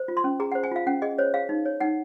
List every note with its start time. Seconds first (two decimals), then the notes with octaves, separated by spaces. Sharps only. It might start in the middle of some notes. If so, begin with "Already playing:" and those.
Already playing: C5
0.08 F4
0.17 C6
0.24 C#4
0.40 G#4 A#5
0.52 C5 F#5
0.63 G#5
0.72 F4 F5
0.87 C#4 F#5
1.02 G#4 D#5
1.18 C5 C#5
1.34 G#4 F5
1.49 D#4
1.66 C#5
1.80 D#4 F#5